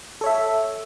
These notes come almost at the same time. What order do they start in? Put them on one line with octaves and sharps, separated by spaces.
A4 C#5 E5